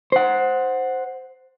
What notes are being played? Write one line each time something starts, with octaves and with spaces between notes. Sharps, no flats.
C5 F#5